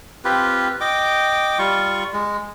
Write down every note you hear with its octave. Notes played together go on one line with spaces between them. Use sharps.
C4 F4 G4 B4
D#5 G5 D6
G3 F4 C#6
G#3